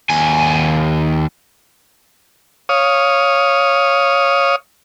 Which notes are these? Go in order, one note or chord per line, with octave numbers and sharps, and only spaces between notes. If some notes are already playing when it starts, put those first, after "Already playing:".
D#2 G#5
C#5 F5 D#6